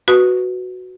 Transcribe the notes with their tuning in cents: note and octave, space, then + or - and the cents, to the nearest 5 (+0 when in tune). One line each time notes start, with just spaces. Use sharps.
F#4 +0 B4 +0 D#6 +0